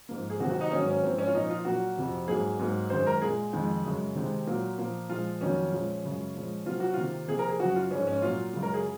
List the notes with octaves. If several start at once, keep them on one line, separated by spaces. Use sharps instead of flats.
G#2 F3 A#3
G#4
C3 D#3 F#3 A#3 F#4
F#4
D#4
G#2 D#3 F#3 A#3 C#4
C#4
G#2 F3 A#3 C4
C#4
F4
A#2 F3 A#3 D#4
F4
A#2 F#3 A#3 F#4
F2 C3 F3
G#2 F#3 A#3 G#4
G#2 F#3 A#3
F#2 D#3 G#3 C5
A#4
A#2 G#3 G#4
F2 D#3 G#3
F#2 C#3 G#3
C3 D#3 G#3
A#2 F#3 A#3
A#2 F3 A#3
A#2 F3 G#3 F4
F2 D#3 F#3 A#3 C#4
A#2 F3 G#3
F#2 C#3 G#3
A#2 F3 G#3
C3 F#3 A#3 F4
F#4
C3 D#3 A#3 F4
C3 F3 A#3 G#4
A#4
G#4
F#2 C#3 F#3 F#4
F4
G#2 F3 G#3 C#4
C#4
A#2 F#3 A#3 F4
F#2 C#3 G#3
A#4
G#4